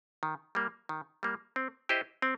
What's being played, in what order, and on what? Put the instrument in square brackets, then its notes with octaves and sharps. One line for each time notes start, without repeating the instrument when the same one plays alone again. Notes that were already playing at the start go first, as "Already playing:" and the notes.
[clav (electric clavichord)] D#3
G3 A#3
D#3
G3 A#3
C4
E4 G4 C5 D#5
C4